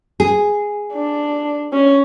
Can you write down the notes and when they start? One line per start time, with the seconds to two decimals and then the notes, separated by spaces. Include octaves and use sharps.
0.20 G#4
0.93 D4
1.73 C#4